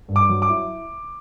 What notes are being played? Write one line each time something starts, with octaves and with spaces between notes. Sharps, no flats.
G2
D6
F#3
D6
E4